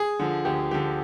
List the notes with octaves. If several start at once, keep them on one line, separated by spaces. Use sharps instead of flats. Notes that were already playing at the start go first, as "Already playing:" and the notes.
Already playing: G#4
D3 F3
D2 G4
D3 F3 G4